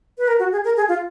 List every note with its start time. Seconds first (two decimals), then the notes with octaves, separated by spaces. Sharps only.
0.18 B4
0.28 A#4
0.39 F#4
0.52 G#4
0.65 A#4
0.77 G#4
0.89 F4